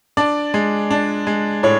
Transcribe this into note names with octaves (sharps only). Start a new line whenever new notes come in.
D4 D5
G#3
D4
G#3
A2 C#5